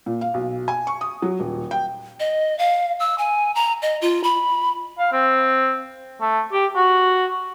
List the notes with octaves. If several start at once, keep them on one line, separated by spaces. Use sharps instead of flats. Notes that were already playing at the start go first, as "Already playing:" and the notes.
A#2
F5
B1
G#5
C#6
D#6
F#3
D#1
G5
D#5
F5
E6
G#5
A#5
D#5
F4
B5
F5
C4
A3
G4
F#4